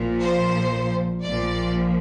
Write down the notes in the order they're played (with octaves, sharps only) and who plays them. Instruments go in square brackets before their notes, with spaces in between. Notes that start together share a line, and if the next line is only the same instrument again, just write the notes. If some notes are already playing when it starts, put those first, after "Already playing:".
Already playing: [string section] A#1 A#2 F3
C5
A#1 A#2 F3 D5